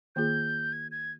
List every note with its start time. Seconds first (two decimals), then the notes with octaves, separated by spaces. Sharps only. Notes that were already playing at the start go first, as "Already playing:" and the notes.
0.16 D#3 A#3 F4 G#4 G6
0.73 G#6
0.91 G#6